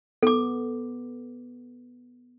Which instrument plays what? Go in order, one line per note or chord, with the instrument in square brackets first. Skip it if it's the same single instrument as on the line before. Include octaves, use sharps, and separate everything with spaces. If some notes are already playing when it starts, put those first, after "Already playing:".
[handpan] B3 [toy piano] A4 D6